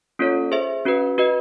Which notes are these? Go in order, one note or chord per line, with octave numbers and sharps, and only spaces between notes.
A#3 C#4 F4 A4 C#5
G#4 C5 E5
C#4 F#4 B4
F#4 B4 D#5